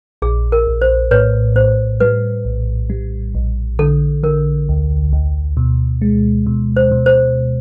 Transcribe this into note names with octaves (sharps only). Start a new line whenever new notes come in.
A#1 G#4
A#4
A#1
C5
A2 B4 C#5
A2 C5
G3 B4
A#1
G3
A#1
D3 A4
D3 A#4
D2
D2
B2
G#3
B2
C5
B2
C5